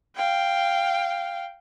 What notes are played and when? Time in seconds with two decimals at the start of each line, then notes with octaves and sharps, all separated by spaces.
0.16 F5 G5